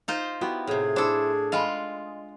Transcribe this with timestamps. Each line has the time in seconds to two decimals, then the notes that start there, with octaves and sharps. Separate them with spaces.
0.08 D#4 F4 C5
0.41 B3 E4 F#4 G4
0.67 A2 C3 G#4
0.96 D4 E4 A4 C5
1.52 G#3 F4 D#5 F5 G#5 B5